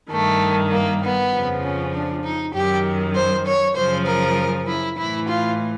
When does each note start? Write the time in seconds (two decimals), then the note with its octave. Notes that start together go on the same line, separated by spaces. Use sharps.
0.11 G2 D#3 A3
0.72 A#3
1.03 B3
1.33 F2 C#3 F3
1.63 C#4
1.94 D4
2.24 D#4
2.54 F#2 D#3 G4
3.15 C5
3.46 C#5
3.76 F#2 C#3 F3 C5
4.06 A#4
4.67 E4
4.97 A2 E3 E4
5.28 F4